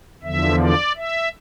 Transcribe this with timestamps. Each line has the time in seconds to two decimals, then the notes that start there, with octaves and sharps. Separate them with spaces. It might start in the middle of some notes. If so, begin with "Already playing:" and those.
0.22 E2 D3 F3 E5
0.60 D5
0.96 E5